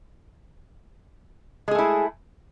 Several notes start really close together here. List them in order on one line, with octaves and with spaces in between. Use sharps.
G#3 G#4 A3 E4